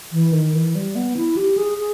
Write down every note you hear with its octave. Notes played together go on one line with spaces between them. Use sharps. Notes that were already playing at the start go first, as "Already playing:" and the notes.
E3
D#3
E3
G3
B3
E4
G4
G#4
G#4